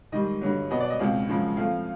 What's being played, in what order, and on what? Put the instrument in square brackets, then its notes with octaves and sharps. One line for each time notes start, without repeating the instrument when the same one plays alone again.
[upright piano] G#2 D#3 G3 D#5
G2 D3 F#3
B2 F#3 B3 D#5
D5
D#5
C#2 B2 G#3 C4 F5
F#2 C#3 F3 G#3
A2 F3 A3 C4 F5